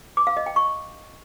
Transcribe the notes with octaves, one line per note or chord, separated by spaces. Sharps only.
D6
F5
D#5
G5
C#6